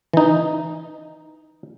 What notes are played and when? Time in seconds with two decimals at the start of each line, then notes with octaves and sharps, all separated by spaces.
0.13 E3 D#4